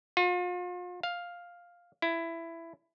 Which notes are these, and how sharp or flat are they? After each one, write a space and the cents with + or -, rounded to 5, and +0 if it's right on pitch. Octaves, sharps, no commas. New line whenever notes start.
F4 +40
F5 +5
E4 +15